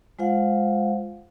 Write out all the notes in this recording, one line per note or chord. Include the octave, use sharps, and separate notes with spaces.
G#3 F4 C5 F5 F#5